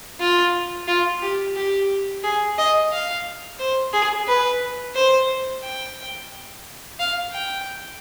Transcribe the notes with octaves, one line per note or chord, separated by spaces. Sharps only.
F4
F4
G4
G4
G#4
D#5
F5
C5
G#4
B4
C5
G5
F5
G5